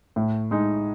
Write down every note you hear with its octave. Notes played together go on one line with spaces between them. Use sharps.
A2
G#3 D#4